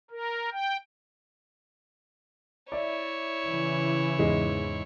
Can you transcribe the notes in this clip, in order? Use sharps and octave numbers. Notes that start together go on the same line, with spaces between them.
A#4
G5
E4 C#5 D5 E5
C#3 E3
E2 G#2 G#3